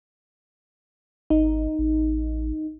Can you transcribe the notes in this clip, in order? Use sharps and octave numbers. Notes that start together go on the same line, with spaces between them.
G#1 D#4
A1